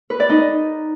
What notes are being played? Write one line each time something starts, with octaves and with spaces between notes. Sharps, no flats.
B4
D5
D#4